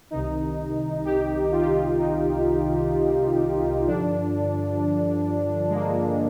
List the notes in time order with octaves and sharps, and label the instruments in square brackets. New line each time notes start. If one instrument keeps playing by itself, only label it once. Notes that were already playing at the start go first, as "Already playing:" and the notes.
[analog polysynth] C2 C3 D#3 D#4
G4
F4
G4
F4
D#4
G2 D3 F3 D4
G#3
A#3